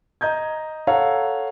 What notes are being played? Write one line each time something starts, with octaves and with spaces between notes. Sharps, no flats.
D#5 A#5 G6 G#6
A4 C#5 F5 F#5 A#5